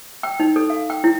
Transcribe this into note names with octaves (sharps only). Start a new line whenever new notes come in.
G5
D#4
A4
F5
G5
E4